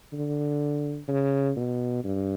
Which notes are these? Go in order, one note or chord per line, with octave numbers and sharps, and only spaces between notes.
D3
C#3
B2
G2